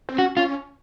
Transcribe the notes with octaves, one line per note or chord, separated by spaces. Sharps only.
C4
C#4 F#4
C#4 F4